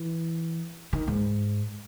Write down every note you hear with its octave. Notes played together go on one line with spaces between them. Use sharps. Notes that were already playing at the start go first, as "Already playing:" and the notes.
Already playing: E3
D#3
G#2